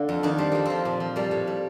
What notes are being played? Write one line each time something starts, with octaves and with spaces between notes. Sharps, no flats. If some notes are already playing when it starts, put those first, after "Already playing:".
Already playing: D3 A#3
F2
D#3 D4
G3 C4
F2 A#3
F3 C4
A#2
F3
G3 A#3
A2
G3